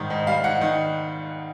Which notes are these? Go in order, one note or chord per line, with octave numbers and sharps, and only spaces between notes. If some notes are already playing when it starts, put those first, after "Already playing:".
Already playing: G#2 D#3 G3
G#2
G3 F5
G#2 F#5
D#3